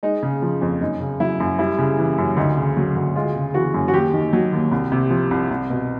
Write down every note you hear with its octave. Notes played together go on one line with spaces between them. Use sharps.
G#3 D#4
C#3
F3
F2
F#2 D#4
C#3
F#3 E4
F#2
G3 E4
C#3
E3
F#2
D2 D#4
C#3
F#3
D2
G#3 F4
C#3
E3 F#4
F#2
F#4
D#2 G4
D#3
F#3
D#2
C2
C3
F3
C2
C2
B2